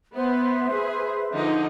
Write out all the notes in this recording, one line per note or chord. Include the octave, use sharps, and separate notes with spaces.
B3 B4 C5 E5
G#4
D3 F3 D#4